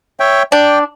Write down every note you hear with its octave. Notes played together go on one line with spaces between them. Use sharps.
C#5 E5 G5
D4 D5 G5